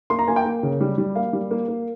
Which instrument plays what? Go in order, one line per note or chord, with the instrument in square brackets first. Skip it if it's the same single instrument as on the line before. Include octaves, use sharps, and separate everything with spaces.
[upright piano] A#3 C6
A#5
A#3 G#5
G5
A#3
C#3
G3
G3
A#3 F5
G3
A#3
A#3